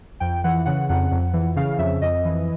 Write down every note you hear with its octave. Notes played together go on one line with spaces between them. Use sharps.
F2 G5
E3 F#5
C#3 F#5
F2 F#5
F2
E3
C#3 F5
F2 E5
F2 D#5
E3